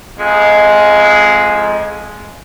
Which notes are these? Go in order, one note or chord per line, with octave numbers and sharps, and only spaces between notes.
F2 G#3